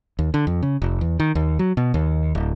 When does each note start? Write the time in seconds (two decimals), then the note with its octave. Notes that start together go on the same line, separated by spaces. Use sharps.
0.19 D#2
0.34 D3
0.47 F2
0.63 C#3
0.82 F1
1.01 E2
1.20 D#3
1.35 D#2
1.59 F#3
1.77 B2
1.94 D#2
2.35 D1